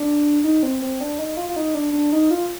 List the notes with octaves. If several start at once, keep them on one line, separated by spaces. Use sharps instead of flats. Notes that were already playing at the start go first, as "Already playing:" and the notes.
Already playing: D4
D#4
C4
C4
D4
D#4
F4
F4
D#4
D4
D4
D#4
F4